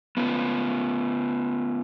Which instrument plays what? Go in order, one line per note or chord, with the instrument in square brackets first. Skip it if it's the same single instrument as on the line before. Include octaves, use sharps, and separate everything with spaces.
[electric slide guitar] B3 C#4 F4